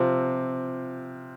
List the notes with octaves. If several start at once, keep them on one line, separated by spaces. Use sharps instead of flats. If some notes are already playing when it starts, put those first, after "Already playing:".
Already playing: C3 F3 C4 F4